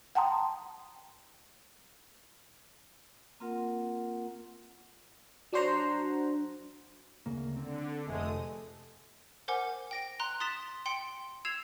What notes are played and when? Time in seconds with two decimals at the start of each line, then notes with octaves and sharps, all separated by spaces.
0.15 F#5 G5 A5 A#5 C6 D#6
3.40 A#3 C4 F4 A#4 F#5
5.53 F#3 D4 F#4 C5 F#5 A#5
7.26 D2 C#3 A#3
7.57 D3 C4
8.07 F1 G#3 A3 D#6
9.48 A#4 C5 F#5 G#5 D6
9.91 G5 A#6 D7
10.20 A#5 C6 F#6
10.40 C6 D#6 A6 B6 E7
10.86 G5 C6 C#7 D7
11.45 E6 G#6 C7 E7 F7